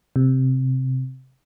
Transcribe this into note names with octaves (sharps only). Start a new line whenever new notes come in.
C3